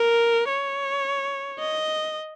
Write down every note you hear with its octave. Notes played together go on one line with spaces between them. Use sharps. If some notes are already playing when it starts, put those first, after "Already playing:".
Already playing: A#4
C#5
D#5